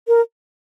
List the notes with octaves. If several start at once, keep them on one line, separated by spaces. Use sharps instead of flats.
A#4